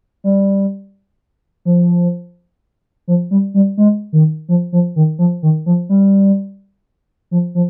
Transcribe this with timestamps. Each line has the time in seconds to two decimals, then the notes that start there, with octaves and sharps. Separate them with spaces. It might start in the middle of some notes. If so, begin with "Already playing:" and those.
0.24 G3
1.65 F3
3.08 F3
3.31 G3
3.54 G3
3.77 G#3
4.13 D#3
4.49 F3
4.72 F3
4.96 D#3
5.19 F3
5.43 D#3
5.66 F3
5.89 G3
7.31 F3
7.55 F3